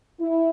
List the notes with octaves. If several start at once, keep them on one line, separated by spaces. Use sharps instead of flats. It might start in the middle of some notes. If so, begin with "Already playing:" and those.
E4